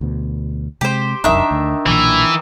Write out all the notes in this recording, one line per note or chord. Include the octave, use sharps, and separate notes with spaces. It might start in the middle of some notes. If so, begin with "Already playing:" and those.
D2 B2
C3 G#3 G4 C5
F1 C2 F#2 D#3 D4 D#4 E5
D2
B1 A#2 E3